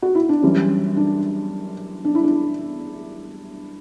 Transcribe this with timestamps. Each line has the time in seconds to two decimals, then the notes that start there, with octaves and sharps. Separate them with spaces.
0.02 F#4
0.15 E4
0.29 D4
0.43 F#2 E3 G3 C#4
0.97 D4
2.05 D4
2.15 E4
2.24 D4